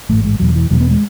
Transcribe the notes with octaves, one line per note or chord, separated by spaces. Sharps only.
A1 G#2 A3
G#3
E1 E2 B2 F#3
E3
E1 E2 B2 F#3
B3
G#3